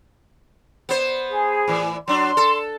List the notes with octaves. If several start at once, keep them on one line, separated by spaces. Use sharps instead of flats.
B3 C5
G#4
A2 E3
F#3 D4 C6
A4